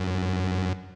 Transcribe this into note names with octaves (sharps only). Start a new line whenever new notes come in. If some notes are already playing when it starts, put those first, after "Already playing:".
Already playing: F#2